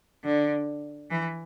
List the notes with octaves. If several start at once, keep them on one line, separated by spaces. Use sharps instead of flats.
D3
E3